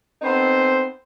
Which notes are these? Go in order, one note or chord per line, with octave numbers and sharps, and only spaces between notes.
B3 C4 D#4 A4 C5